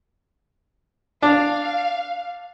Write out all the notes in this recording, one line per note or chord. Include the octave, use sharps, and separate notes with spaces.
D4 F5